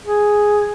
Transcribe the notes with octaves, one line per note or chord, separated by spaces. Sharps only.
G#4